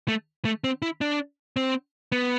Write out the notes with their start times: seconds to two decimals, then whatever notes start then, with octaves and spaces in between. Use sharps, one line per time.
0.08 A3
0.45 A3
0.64 C4
0.82 E4
1.01 D4
1.56 C4
2.12 B3